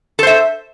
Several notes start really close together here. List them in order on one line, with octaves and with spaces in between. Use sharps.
A4 C5 E5